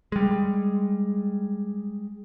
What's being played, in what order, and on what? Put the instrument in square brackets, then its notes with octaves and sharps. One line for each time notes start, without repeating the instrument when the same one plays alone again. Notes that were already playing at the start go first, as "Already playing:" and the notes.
[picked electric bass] G3 G#3